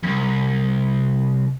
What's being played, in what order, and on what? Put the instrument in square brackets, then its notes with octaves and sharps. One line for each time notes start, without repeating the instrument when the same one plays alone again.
[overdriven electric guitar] C2 F2